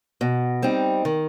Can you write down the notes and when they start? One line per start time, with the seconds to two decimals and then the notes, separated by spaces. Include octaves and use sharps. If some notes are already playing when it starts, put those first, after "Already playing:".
0.21 B2
0.62 G3 C4 D#4
1.05 D#3